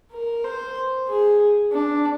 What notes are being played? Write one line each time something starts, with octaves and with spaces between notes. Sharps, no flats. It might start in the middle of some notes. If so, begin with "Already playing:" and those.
A#4
C5
G#4
D4